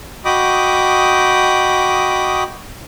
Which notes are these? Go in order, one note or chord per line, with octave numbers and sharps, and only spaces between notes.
F#4 D#5 G5 B5 D6 D#6